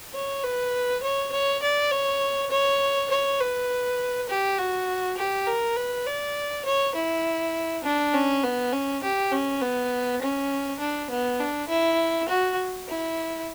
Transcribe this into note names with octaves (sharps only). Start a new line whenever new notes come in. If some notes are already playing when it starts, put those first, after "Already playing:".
C#5
B4
C#5
C#5
D5
C#5
C#5
C#5
B4
G4
F#4
G4
A#4
B4
D5
C#5
E4
D4
C#4
B3
C#4
G4
C#4
B3
C#4
D4
B3
D4
E4
F#4
E4